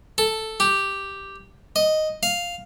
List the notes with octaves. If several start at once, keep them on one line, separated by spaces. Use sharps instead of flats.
A4
G4
D#5
F5